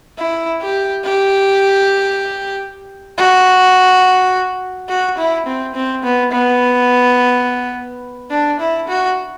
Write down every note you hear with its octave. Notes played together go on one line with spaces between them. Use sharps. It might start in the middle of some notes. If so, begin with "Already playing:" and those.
E4
G4
G4
F#4
F#4
E4
C4
C4
B3
B3
D4
E4
F#4